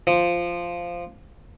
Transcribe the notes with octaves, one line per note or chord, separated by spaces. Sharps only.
F3